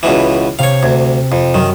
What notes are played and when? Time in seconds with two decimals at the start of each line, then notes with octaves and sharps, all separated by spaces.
0.03 C#2 B2 E3
0.59 C3 C#5 F5
0.83 D2 G#6
1.32 F2
1.54 F#2 D#3